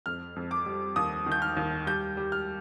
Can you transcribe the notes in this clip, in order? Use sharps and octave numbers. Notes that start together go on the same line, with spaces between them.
F2 F6
F2
D6
G3
D#2 D#6
D#3
G6
F6
D#2
G3 G6
G3
F6